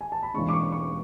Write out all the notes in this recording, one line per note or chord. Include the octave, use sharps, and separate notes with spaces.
G#5
A5
B5
E1 E2 C#3 G#3 D4 C#6
D6
C#6
C#6